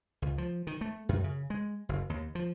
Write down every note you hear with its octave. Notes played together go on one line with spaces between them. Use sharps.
C#2
F3
D#3
A3
F#2
C#3
G#3
F#1
D#2
F3